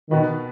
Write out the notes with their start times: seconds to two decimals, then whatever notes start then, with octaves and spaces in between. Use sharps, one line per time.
0.10 B2 D#3 B3 F#4 B4